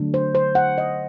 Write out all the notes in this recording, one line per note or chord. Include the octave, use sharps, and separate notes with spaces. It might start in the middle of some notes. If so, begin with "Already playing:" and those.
Already playing: D3 F#3 A3 D4
C5
C5
F#5
D#5